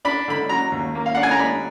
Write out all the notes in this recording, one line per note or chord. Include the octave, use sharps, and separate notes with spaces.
D4 B5
D3 B5
F#3 A#5
D#2
A#3
F5
D4 F#5
G#5
A#5
D4 B5